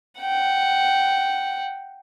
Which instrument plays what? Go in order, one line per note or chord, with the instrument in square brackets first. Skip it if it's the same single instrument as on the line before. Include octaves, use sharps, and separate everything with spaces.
[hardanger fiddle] F#5 G5